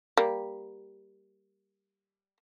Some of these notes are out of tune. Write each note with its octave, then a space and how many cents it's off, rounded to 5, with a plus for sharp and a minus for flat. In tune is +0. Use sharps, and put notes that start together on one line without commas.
G3 +0 A#3 +0